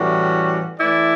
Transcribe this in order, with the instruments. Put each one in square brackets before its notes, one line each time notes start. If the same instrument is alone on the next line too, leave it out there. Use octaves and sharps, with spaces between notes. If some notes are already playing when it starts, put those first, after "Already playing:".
Already playing: [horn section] A2 E3 G3 C#4 F#4
E3 A3 E4 B4 D5